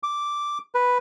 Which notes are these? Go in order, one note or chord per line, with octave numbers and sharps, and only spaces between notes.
D6
B4